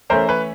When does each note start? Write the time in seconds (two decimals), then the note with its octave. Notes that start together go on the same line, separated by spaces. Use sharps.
0.10 E3 A3 C#4 A#4 C5
0.29 B4 C#5